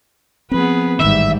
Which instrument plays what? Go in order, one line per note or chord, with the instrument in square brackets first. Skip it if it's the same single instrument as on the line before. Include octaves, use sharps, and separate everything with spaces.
[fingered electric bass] F3 C4 [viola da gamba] B3 G#4 B4
[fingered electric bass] A1 D#3 [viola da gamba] G#2 G3 [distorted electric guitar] E5